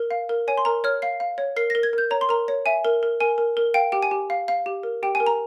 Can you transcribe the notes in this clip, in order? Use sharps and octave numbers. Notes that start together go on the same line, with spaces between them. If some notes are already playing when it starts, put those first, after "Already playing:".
Already playing: A#4
F5
A#4
C#5 G#5
C6
A#4 A#5
C#5 F6
F5 C7
F5
C#5
A#4 C7
A#6
A#4
G#6
A#4 G6
C#5 A#5
C6
A#4 A#5
C#5
E5 G#5
A#4
A#4
A#4 G#5
A#4
A#4
F5 G5
G4 G5
G#5
G4
F5
F5
G4
A#4
G4 G5
G#5
A#4
A#5